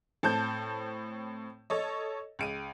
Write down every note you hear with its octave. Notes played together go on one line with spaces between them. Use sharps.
A2 C4 A5 G6
A4 C#5 D#5
C#2 D7 D#7